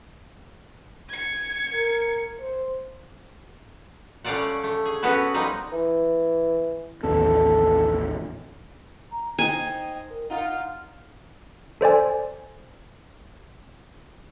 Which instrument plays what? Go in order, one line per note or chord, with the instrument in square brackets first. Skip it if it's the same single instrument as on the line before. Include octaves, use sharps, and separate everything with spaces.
[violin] G#6 C#7
[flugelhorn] A#4
C5
[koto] G3 A3 C#4 D5 F5 F#5
A3
G#4
B3 C#4 F#4 A4 B4
F3 G3 D#4 B4
[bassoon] E3
[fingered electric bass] A1 D#2 C4 [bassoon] A4
[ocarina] A#5
[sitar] D#4 C5 [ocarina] G5 [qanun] G#5
[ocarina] A#4
[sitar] D#4 F4 [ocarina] F#5
[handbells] A4 C5 D5 G#5